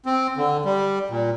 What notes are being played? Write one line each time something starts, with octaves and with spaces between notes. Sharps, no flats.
C4
D3
G3
A#2